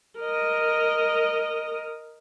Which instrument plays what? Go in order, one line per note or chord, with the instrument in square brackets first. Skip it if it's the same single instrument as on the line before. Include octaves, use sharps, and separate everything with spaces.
[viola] A#4 D#5